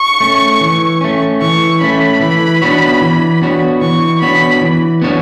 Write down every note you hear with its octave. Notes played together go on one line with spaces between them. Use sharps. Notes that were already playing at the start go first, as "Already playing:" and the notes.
Already playing: C#6
A3 C#4
E3
A3 C#4
E3 C#6
A3 C#4 B5
E3
B3 D4 F#4 C#5
E3
B3 D4 F#4 C#5
E3 C#6
B3 D4 F#4 C#5 B5
E3
B3 D4 F#4 C#5